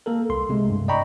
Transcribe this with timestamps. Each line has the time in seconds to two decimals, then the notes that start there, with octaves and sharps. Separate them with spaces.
0.06 A#3 A4 A#4
0.30 C2 C6
0.49 C3 G#3 A3
0.70 G2
0.88 D5 D#5 G5 A#5 B5 C#6